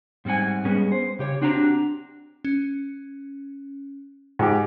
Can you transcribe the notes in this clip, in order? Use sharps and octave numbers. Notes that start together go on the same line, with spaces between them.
G#2 G3 C4 F#5 G#5
G3 G#3 B3 C#4
C5
C#3 G4 C#5
C4 D4 F#4 G4 A#5
C#4
G#2 G4